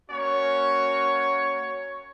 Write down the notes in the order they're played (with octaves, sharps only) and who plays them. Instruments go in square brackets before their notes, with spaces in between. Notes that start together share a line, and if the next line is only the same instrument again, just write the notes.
[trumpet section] A#3 C#4 F#4 C#5